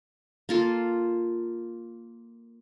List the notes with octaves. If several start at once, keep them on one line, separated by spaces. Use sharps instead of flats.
A#3 F4 A4